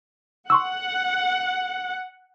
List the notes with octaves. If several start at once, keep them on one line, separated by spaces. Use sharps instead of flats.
F#5 C6 C#6 E6